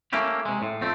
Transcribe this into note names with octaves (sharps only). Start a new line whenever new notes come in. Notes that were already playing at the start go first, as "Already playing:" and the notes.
A3 A#3 C#4 E4 G4
C3 G#3
A2
F2 A3 C4